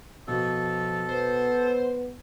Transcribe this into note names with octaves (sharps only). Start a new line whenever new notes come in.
B2 F3 A4
B3 C5